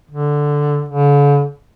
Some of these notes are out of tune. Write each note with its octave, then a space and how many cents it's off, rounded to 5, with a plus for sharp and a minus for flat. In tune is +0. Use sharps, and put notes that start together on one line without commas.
D3 +0
D3 -45